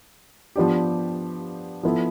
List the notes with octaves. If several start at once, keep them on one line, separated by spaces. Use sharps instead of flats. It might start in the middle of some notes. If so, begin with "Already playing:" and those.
F3 B3 D4 G4
F3 B3 E4 A4